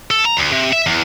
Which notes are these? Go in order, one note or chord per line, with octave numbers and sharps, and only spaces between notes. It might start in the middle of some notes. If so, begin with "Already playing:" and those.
A4
A#5
D2
C3
E5
E2